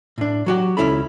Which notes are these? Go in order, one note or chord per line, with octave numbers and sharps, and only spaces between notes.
A2 D4
F#3 F#4 G4
C#2 B2 C#4 E4 A4 B5